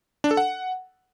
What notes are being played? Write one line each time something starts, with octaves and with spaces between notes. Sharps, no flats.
D4
A4
F#5